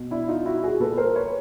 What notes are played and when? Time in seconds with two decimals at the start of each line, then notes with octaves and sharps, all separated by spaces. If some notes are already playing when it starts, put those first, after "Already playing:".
Already playing: B2
0.11 D4 E4
0.28 D#4 F4
0.46 E4 F#4
0.63 F#4 G#4
0.80 A#2 A4 B4
0.98 A#4 C5
1.15 B4 C#5